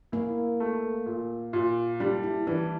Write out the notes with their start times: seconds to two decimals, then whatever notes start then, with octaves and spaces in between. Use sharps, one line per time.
0.12 A#3 E4
0.60 A3
1.06 A#2
1.53 A#2
2.00 G3 D4
2.23 E4
2.47 E3 D4